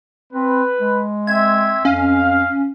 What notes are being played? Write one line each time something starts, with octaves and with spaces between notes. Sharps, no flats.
C4 B4
G#3
C4 E5 G#6
F2 C#4 F5